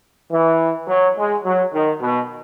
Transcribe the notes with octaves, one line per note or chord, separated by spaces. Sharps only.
E3
F#3
G#3
F#3
D#3
B2